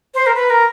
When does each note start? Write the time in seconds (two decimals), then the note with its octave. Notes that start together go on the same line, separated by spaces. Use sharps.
0.14 C5
0.26 A#4
0.35 B4
0.50 A#4